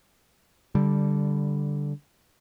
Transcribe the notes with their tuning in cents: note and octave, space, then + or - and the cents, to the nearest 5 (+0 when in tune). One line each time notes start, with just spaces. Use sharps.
D3 -10 G3 +0